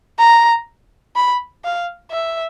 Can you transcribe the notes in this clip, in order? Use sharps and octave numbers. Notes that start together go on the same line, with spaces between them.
A#5
B5
F5
E5